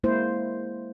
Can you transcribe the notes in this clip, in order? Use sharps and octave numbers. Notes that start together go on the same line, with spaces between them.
G#3 A#3 E4 C5